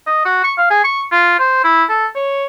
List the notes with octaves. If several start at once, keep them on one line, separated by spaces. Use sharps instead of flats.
D#5
F#4
C#6
F5
G#4
C#6
F4
C5
E4
A4
C#5